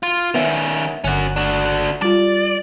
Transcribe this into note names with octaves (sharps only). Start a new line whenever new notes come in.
F4
D#3 B3 C#4 E5 F#5
G1 D3 C#4 F#4 F#6
D4 F#4
G3 F4 D5